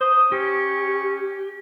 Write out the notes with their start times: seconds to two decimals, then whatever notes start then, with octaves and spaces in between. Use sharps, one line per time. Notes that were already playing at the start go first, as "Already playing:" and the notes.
0.01 C5 D#6
0.32 C#4 G4